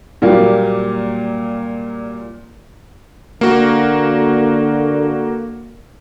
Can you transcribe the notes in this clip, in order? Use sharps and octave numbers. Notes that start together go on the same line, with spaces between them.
A#2 F#3 G3 A#3
D3 A#3 F#4